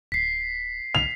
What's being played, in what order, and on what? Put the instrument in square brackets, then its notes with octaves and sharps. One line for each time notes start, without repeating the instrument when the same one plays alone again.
[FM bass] D1 [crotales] B6 C7
[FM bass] C#2 [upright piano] F7